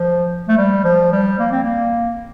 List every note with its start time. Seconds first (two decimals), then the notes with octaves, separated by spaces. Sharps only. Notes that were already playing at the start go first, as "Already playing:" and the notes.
Already playing: F3
0.48 A3
0.58 G3
0.84 F3
1.12 G3
1.39 A#3
1.52 C4
1.63 A#3